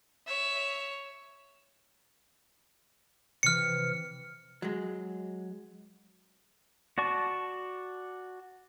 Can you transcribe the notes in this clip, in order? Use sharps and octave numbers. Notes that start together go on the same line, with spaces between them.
C#5 E5
C3 E3 F6 C#7
F#3 G#3
F#4 D5 A5 C#6